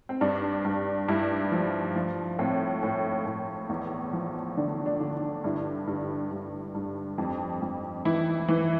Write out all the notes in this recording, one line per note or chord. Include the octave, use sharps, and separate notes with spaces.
C4
G2 D4
G2
G2 E4
F3
F3
A2 C4
A2
A2
E2
F3
D3 D4
D4
D3
G2 E4
G2
G2
G2
F2
F2
E3 E4
E3